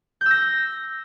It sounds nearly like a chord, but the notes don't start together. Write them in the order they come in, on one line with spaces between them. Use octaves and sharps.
G6 E6 A#6